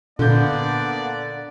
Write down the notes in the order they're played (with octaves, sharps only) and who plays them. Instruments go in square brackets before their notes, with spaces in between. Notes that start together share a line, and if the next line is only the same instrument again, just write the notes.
[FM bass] A#2 [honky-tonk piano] D3 G6 [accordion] A#3 B3 D4 [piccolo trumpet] D5